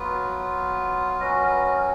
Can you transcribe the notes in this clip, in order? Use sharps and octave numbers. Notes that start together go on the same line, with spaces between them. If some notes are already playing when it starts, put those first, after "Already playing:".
Already playing: F#3 B3 F4 B4
F5
F#3 C#4 F#4 D#5
A#4
B4
A#4